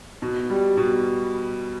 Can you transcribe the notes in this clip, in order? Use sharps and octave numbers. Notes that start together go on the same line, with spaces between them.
B2
G3
B2